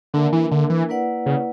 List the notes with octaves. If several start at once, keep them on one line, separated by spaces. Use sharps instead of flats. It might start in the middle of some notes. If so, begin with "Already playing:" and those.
D3 A#3 D4 A#4 E5
E3
D3
E3
A#3 E4 B4 D5 F#5
C#3